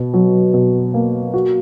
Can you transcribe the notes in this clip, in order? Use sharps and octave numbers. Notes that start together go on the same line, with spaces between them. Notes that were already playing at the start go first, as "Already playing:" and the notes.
Already playing: B2
F#3
B2
A#3
F#4